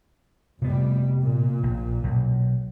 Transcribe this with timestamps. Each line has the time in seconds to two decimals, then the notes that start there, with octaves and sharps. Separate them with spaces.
0.62 F1 C3 G3 B3
1.21 A#2
1.63 A#1
2.03 B1